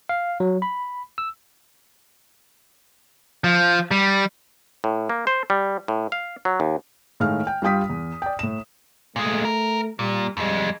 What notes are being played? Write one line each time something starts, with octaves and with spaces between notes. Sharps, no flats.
F5
F#3
B5
E6
F3
G3
A2
A#3
C5
G3
A2
F5
F#3
D#2
A2 D#3 G#3 F5 F6
G5
G2 G3 F4 G5 D#6 B6
E2
D5 G5
A2 E7
A#2 G#3 A3
A#4
A#2 G3
F2 G3 G#3